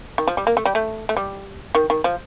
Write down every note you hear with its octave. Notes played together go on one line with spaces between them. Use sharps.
D#3
F3
G3
A#3
A3
G3
A3
A3
G3
D#3
D#3
F3